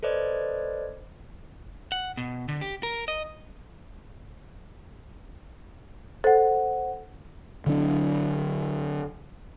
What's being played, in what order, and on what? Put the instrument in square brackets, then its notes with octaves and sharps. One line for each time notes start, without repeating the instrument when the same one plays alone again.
[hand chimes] A4 B4 C5 D5 D#5
[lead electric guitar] F#5
B2
D3
G4
A#4
D#5
[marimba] A4 [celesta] C5 F#5
[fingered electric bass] D3 F#3 D4